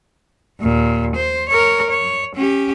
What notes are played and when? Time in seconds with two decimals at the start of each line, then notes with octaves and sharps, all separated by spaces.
0.61 D#2 A#2
1.15 C5
1.49 A#4 C#5
1.90 C#5
2.35 C#4 G4